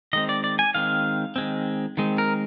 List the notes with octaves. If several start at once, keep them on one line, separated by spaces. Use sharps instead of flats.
D#3 G#3 C4 D#5
D5
D5
G#5
D#3 G#3 C4 F5
D#3 G#3 C4
D#3 G#3 C4
A#4